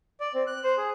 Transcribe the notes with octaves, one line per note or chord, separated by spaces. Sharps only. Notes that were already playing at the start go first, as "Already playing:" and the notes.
D5
C4
F#6
C5
G#4